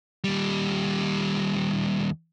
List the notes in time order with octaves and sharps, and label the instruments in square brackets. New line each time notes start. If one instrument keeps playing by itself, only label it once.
[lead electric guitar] D#2 G3